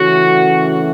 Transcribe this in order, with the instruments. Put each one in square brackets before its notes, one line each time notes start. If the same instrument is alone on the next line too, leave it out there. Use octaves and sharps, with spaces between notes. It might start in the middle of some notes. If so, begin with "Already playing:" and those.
Already playing: [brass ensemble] C#3 E3 A3 C#4 F#4